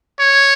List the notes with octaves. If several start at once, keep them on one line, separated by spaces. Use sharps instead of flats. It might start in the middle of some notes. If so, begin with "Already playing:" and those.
C#5